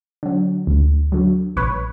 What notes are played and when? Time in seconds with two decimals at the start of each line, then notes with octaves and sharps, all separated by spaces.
0.23 D3 F#3
0.67 D2
1.12 D3 F#3
1.56 A#1 B4 C#5